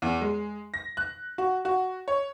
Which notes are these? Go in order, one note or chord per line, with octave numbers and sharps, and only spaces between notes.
E2
G#3
A#6
F#6
F#4
F#4
C#5